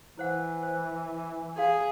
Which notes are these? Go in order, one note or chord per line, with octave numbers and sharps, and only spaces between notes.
E3 E4 C5 F#5
C5
G#4 F5 C6